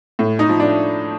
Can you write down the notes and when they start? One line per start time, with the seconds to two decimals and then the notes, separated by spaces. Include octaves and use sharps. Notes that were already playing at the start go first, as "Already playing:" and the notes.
0.19 A2
0.39 D#4
0.49 F3
0.60 D4